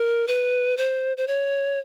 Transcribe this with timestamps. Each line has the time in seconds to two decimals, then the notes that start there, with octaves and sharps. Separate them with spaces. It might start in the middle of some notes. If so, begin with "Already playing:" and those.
Already playing: A#4
0.28 B4
0.77 C5
1.17 C5
1.27 C#5